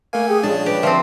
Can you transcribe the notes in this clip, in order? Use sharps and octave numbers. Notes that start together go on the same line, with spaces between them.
A3 A#3 G#5
G4 G#4
A#1 C#3 G#3 D4 A5
G4 B4
F3 C4 E5